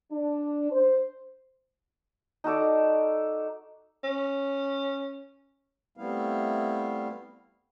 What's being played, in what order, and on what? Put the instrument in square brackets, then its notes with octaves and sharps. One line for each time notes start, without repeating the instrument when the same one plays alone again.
[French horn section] D4
C5
[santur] D#4 F#4 A4 D5
[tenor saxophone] C#4
[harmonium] G3 A3 B3 C4 E4 F5